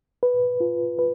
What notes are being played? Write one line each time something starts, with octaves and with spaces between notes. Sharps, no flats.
B4
F4
B4